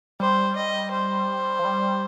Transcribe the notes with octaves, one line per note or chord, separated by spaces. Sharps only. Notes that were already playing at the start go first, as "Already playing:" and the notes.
G3 C5
D#5
C5
F3
G3